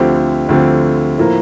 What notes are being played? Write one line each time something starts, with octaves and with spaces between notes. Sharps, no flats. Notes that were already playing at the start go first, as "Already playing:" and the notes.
Already playing: D2 D3 F3 C4 G4
D2 D3 F3 C4 G4
A2 F3 A#3